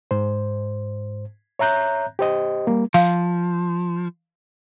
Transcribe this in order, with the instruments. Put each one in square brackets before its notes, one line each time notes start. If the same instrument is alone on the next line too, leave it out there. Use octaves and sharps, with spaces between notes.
[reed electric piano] G#2 C5
C#5 E5 A#5 F#6 G6
G4 C5 D#5
G3 A#3
[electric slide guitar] F3 [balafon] F5